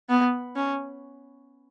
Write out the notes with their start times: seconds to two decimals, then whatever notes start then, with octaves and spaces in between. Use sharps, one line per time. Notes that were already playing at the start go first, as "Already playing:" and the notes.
0.09 B3
0.56 C#4